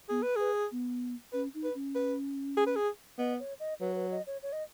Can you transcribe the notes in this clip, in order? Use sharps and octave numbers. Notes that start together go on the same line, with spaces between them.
B3 G#4
B4
G#4 B4
B3
C#4 B4
D#4
B4
C#4
B4
G#4
B4
G#4
B3 D#5
C#5
D#5
F#3 B4
B4
D#5
C#5
C#5
D#5